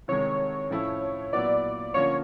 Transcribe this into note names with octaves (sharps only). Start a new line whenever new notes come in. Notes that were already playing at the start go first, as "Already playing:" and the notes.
C2 C3 D#3 G#3 C#5
A2 F3 A3 C#4 E4
A#2 F#3 B3 E4 D5
D3 F3 A#3 C#4 F4 C#5